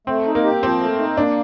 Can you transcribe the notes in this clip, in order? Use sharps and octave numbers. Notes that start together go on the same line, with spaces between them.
A3 C4
D#4
A#3
G4
F3 C4
A3
D#4
A#3 D4